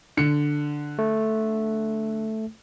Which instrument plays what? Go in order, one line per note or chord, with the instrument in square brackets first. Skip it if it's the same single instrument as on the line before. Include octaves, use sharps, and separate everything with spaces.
[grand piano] D3 C#7
[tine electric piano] A3